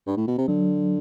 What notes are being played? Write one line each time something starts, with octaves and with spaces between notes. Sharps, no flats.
G2
A2
B2
C3
D3 F#3